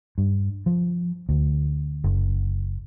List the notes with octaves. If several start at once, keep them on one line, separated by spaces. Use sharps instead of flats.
G2
F3
D2
F#1